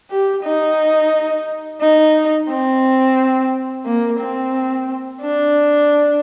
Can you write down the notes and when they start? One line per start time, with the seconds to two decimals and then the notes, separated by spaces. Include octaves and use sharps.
0.10 G4
0.43 D#4
1.81 D#4
2.49 C4
3.86 A#3
4.20 C4
5.22 D4